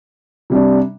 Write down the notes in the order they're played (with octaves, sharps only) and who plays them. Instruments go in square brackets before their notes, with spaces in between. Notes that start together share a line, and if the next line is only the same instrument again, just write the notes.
[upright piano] C3 G3 D4